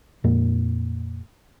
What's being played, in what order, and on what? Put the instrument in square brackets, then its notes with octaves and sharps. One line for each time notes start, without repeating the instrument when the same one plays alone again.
[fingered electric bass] F2 A#2 A#3